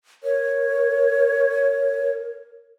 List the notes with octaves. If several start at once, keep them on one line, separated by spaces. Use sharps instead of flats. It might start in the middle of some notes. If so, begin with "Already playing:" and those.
A#4 C#5